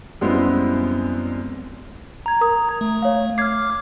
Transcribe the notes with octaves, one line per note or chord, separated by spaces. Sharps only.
F#2 G3 G#3 B3 C4 E4
A#5 G#6
A#4 D#6
A3
C#5 F5
D6 F6 G#6 C7